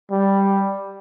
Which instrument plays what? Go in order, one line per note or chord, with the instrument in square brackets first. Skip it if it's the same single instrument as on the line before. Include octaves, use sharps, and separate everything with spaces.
[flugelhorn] G3